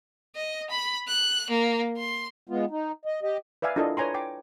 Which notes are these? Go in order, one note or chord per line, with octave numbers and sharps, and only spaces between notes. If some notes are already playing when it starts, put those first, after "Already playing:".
D#5
B5
F#6
A#3
C6
G#3 B3 F4
D#4
D#5
G4 D#5
B4 D5 E5 F5 G#5
D4 E4 F4 A4 A#4 D#5
B4 C#5 G#5 A#5 C6
G5 D6